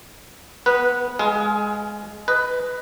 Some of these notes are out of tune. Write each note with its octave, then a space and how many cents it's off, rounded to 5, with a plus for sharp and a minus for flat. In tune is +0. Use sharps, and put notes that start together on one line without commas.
B3 +0 B4 -15
G#3 +0 G#4 +25 F5 +0
B4 +10 D#5 +0